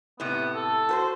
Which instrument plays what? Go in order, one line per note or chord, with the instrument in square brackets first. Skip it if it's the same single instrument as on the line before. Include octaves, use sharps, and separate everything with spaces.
[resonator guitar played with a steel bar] A2 C3 [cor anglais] B3
[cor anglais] A4
[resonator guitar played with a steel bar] F#4 B4 C5